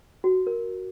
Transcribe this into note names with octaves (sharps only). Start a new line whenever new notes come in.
F#4
A#4